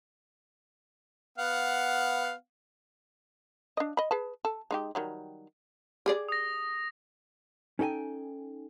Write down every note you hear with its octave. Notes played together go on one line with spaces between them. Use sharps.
B3 F5 F#5
D4 D#5
D#5 B5
G#4 B4 A5
A4
G#3 D#4 G4
D#3 F#3 G3
G4 G#4 D5
D#6 A#6
C#4 D#4 A4 G5 G#5